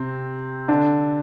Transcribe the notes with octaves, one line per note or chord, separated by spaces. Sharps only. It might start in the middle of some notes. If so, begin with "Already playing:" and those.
Already playing: C3 C4
D3 D4